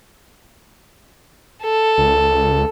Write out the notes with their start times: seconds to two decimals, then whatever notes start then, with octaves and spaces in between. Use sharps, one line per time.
1.62 A4
1.98 C#2